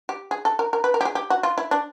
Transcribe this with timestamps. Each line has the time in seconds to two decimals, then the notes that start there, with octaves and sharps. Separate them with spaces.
0.09 G4
0.31 G#4
0.45 A4
0.59 A#4
0.73 A#4
0.84 B4
0.94 A#4
1.01 G4
1.05 G#4
1.15 G4
1.30 F#4
1.43 F4
1.58 E4
1.71 D4